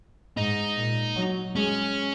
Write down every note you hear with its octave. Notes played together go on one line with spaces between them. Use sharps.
G#2 D#4
A#2
F#3
G#3 C#4